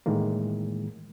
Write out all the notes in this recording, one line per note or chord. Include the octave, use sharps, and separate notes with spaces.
A2 D#3 E3 G#3 A#3